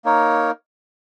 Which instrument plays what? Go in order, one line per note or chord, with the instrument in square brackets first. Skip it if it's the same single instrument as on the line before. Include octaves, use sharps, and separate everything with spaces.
[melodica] A#3 D#4 A#4 C#5